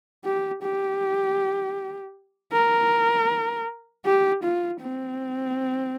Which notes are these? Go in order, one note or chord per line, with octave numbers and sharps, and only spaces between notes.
G4
G4
A#4
G4
F4
C4